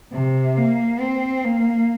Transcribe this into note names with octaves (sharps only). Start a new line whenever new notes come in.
C3
A#3
C4
A#3